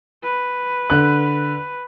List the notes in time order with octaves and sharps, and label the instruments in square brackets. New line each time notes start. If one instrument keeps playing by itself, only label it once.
[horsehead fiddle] B4
[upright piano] D3 F#6